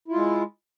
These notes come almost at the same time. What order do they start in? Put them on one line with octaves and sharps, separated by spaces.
E4 F4 G#3